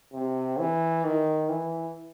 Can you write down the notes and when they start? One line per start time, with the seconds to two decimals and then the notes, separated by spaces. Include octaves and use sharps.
0.14 C3
0.59 E3
1.04 D#3
1.49 E3